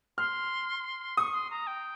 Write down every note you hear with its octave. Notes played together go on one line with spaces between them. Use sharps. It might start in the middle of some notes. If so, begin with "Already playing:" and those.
C6 F6
C#6 D#6
C6
A#5
G5